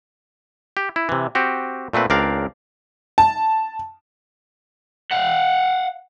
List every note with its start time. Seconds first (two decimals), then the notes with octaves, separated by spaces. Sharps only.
0.77 G4
0.96 E4
1.09 C3 E3
1.35 C4 F#4 G4
1.93 A#2 A3 C4 B4
2.10 C#2 C4 D4 A#4 D5 F5
3.18 A5
5.11 F5 F#5